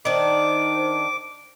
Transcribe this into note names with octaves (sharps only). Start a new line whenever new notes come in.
D#3 D4 C5 D6